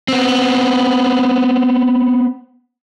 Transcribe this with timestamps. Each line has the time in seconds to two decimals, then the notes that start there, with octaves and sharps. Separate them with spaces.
0.08 B3 C4